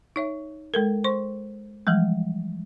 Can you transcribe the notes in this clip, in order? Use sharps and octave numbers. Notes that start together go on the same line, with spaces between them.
D#4 C#5 E5
G#3 A4 A#4
C5 C6 C#6
E3 F3 G3 G#3